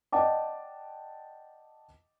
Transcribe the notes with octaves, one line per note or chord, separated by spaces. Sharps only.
D5 D#5 F#5 G5 A5 D6